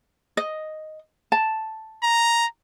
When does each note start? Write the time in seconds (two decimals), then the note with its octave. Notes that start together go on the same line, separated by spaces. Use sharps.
0.37 D#5
1.32 A5
2.03 A#5